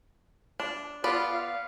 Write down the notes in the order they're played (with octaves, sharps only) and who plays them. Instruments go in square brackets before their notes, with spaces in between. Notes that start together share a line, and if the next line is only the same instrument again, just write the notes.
[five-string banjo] D4
[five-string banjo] B3 D5 [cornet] F4
[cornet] F5